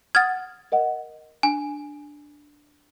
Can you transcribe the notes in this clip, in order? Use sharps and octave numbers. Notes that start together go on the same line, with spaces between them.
F#5 D#6 F6 G#6 A6
A#4 D#5 F#5
D4 G#5